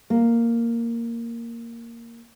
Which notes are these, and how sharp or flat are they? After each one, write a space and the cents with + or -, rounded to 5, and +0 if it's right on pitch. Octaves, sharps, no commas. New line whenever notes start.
A#3 -5